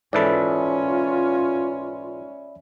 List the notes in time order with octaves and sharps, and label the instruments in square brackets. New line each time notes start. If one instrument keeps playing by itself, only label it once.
[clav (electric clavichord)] G#2 E3 A4 [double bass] C#4 [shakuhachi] F4 [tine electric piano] D5 E5 B5